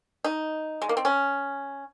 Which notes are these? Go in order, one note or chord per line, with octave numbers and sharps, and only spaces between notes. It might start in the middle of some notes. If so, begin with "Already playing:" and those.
D#4
G#3
A#3
C4
C#4